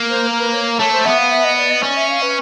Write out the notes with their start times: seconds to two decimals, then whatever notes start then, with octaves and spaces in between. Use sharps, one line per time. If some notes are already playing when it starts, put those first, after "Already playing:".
Already playing: A#3
0.10 C5
0.27 A#4
0.40 B4
0.53 C#5
0.79 A3 C#5
0.92 C5
1.05 B3 E5
1.18 F5
1.31 E5
1.44 D#5
1.57 D5
1.71 D#5
1.83 C#4 D5
1.97 E5
2.09 F5
2.22 B4